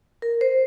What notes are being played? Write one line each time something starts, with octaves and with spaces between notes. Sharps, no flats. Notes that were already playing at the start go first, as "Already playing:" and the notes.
A#4
C5